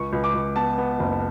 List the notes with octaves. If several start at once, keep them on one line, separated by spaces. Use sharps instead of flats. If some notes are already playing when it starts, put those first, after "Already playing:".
Already playing: C#2 C#6
C#2
D6
C#2
B3 A5
B3
F#1